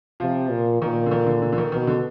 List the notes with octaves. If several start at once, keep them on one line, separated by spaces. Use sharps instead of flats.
C3 F3
A#2
A#2 D#3
D3
D#3
D3
D3
D3
D#3
B2 D#3
D3